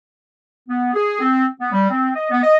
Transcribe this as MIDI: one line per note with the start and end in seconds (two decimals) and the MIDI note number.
0.69 0.93 59
0.94 1.19 68
1.20 1.45 60
1.60 1.70 59
1.72 1.88 55
1.90 2.11 60
2.15 2.26 75
2.31 2.42 59
2.43 2.56 75